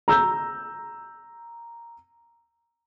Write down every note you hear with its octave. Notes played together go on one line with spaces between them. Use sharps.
A#5 E6 G6